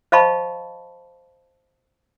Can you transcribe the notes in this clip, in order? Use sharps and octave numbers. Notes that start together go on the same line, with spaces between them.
C5 D#5 F5 A5 B5 C#6